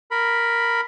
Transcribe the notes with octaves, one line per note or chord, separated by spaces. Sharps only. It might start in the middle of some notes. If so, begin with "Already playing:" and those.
A#4 B5